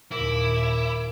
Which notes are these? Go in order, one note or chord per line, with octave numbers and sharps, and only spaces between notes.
D#2 A#2 E4 A#4 D6